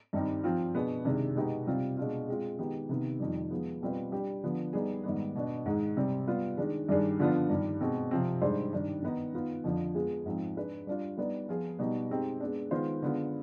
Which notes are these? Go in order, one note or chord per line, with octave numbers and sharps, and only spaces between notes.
G2 D#3 G3 C4 D#4
F3 C4 F4
B2 B3 D4 G#4
C3 D#3 G#3 D4
B2 G#3 B3 D#4 G4
C3 G3 C4 F4
B2 G#3 D4 F4
G#3 C4 F4
D#3 G#3 B3 D#4 G4
C3 D#3 B3
F2 D#3 G3
F3 G#3 B3
B2 G3 C4 F4 B4
G3 D4 G4
D3 F3 B3
G3 B3 D#4 G#4
G#2 D#3 G3 B3
B2 B3 D4
G#2 D#3 G#3
C3 G3 C4
G3 B3 F4
D#3 G#3 D4
G2 D#3 G3 D4 G#4
D3 F3 B3 D4 F4
G2 D#3 G3
B2 G#3 C4
C3 F3 C4
G#2 G3 D4 G#4 C5
G2 D#3 G3 D4
D#3 B3 D#4
D#3 B3 F4
F2 D3 F3
G#3 B3 F4 G#4
G#2 F3 C4
G#3 D4 G#4 B4
G3 D4 F4
G3 B3 D#4 B4 D5
F3 B3 F4 G#4
B2 G3 B3 D#4 G4
G#3 C4 D#4 G4
G#3 B3 D4
D#3 G#3 B3 F4 C5
D3 G#3 B3 F4